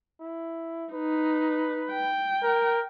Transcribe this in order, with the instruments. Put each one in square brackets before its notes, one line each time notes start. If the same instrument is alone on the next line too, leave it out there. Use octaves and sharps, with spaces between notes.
[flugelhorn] E4
[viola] D#4 [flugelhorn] B4
[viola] G5
[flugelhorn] A#4